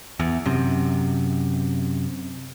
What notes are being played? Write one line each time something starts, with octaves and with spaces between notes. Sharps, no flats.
E2
F#2 C3